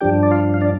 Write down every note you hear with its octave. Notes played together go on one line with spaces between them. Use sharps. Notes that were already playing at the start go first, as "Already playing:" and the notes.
G2 F3 D4 G4 G5
D5
F4 F5
F5
D4 D5